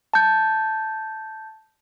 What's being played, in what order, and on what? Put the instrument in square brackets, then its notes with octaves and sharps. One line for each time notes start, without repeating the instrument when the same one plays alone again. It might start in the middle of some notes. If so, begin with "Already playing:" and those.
[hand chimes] A5 G6